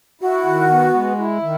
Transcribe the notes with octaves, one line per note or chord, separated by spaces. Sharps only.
E4 F#4
D#3
B3
G#3
E4
D#3